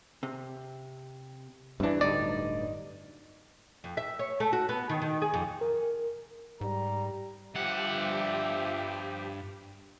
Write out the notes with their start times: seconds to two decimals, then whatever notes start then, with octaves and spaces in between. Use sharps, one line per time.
0.23 C3
1.80 C2 G2 E3 D4
2.01 D1 D2 G2 D#4 D5
3.84 F2
3.97 E5
4.19 C#5
4.40 A3
4.53 F#4
4.69 B3
4.89 D#3
5.02 D#3
5.22 G#4
5.34 F2
5.61 A#4
6.61 G#2 G3 A#5
7.55 G2 F3 G4 E5 F#5